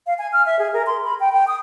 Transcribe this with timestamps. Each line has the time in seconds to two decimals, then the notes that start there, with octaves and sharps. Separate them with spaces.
0.07 F5
0.18 G#5
0.32 F6
0.46 E5
0.59 G#4
0.73 A#4
0.86 C6
1.04 B5
1.20 G5
1.33 G5
1.47 D#6